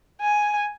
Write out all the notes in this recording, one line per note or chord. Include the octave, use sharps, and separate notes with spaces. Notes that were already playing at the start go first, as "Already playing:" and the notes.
G#5